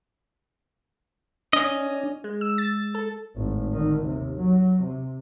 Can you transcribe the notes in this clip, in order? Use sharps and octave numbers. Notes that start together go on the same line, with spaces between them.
C#4 D4 D#5
G#3
E6
A6
A4
G#1 A2
D3 D#3
D#2 C3
F#3
C3